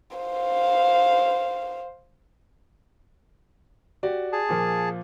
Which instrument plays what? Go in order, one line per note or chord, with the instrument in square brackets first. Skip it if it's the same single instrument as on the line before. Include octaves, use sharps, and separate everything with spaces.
[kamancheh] C5 F5
[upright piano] F#4 G4 D5
[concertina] G#4 A5
[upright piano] A#2 F3 F4